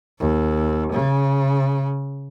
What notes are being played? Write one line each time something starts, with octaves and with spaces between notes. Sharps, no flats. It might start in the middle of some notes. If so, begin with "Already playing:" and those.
D#2
C#3